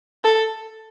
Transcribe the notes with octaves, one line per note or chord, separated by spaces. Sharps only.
A4